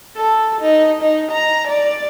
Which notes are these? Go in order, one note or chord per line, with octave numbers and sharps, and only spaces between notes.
A4
D#4
D#4
A#5
D5